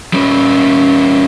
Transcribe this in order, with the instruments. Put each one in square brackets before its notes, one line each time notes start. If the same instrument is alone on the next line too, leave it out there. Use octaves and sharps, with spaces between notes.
[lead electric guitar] G3 C#4